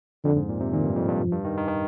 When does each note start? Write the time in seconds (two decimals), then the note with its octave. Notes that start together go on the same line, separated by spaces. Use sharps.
0.24 F2 D3
0.36 G#2
0.49 A#2
0.61 C3
0.73 A#2 D#3
0.84 G2
0.96 F2
1.08 G2
1.21 F3
1.32 G2
1.45 D#3
1.57 D#3
1.69 D#3